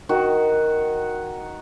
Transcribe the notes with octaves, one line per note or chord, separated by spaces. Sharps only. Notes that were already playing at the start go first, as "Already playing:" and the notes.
D#3 F#4